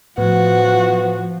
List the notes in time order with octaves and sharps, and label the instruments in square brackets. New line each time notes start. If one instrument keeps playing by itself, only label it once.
[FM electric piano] A2 [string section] F3 [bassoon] B3 [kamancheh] F#4